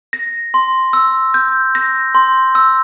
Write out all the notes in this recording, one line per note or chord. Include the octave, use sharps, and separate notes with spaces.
A#6
C6
E6
G6
A#6
C6
E6